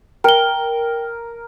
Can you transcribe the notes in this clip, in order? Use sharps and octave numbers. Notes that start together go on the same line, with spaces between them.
A#4 G5 G7